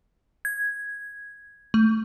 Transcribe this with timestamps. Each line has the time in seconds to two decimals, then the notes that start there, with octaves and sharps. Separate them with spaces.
0.45 G#6
1.74 A3